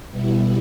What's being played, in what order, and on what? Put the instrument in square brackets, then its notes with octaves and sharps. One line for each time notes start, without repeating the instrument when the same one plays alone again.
[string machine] B2 G3 B3 E4